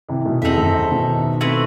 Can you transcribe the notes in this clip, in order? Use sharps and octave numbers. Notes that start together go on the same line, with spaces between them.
C3 E3
B2 D#3
E2 C4 D#4 A4 E5
F#2
E2
B2 D#3
A3 C4 E4 B4